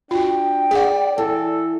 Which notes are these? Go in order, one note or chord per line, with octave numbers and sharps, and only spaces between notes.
D4 F4 F#4 G5
G#4 D5 F#5
E3 A4